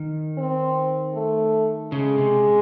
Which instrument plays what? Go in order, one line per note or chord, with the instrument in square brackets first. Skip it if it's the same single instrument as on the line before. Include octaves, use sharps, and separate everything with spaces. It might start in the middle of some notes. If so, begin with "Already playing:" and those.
Already playing: [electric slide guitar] D#3
[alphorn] C4
A3
[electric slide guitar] C#3 [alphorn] G#3
[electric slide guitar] C3